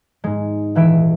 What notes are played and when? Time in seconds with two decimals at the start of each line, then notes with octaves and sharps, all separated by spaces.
0.24 G#2 G#3
0.75 D#1 E3 E5 D7